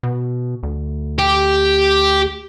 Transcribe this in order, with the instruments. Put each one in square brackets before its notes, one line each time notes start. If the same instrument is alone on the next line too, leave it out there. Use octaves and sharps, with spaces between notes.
[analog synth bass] B2
D2
[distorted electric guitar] G4